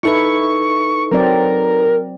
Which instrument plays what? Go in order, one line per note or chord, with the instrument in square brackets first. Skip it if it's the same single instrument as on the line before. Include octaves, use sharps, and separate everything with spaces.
[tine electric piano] D#4 A4 B4 [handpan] E4 [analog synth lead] C#6
[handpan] F#3 C4 D5 [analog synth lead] A#4